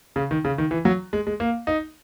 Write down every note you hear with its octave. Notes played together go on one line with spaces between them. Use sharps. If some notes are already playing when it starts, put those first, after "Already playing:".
C#3
D#3
C#3
D#3
E3
F#3
G#3
G#3
A#3
D#4